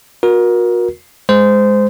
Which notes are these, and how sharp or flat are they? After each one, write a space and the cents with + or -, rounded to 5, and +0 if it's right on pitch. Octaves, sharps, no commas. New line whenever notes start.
F#4 -35 A#4 +25
G#3 +0 C5 -20